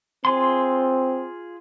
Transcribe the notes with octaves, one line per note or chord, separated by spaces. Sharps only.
C4 F4 G#4 C6